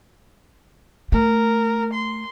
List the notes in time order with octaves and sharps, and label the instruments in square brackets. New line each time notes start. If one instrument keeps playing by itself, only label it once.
[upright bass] A3 [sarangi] A#4
[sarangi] C6